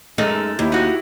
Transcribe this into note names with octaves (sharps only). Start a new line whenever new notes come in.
F#2 G#3 A3 D#4 A#4
D#2 E4 G4
D#4 F#4